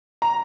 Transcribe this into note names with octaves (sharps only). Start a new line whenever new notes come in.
A#5